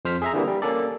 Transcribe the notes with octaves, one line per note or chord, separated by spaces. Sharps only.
F2 C5 F6 B6
G#4 E5 A#5
D3 E3 G3 A#3
G3
A#3 C#4 A4 D5